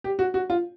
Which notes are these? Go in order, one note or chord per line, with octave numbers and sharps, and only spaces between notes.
G4
F#4
F#4
F4